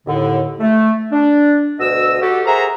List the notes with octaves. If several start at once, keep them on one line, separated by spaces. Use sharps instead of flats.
D#2 A2 D3
A3
D4
D2 B2 D#5 E6
F#4 G4 A4
G#4 A#4 C5 E5 F#5 A#5